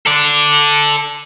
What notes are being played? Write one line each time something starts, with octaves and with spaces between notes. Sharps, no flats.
A4 D5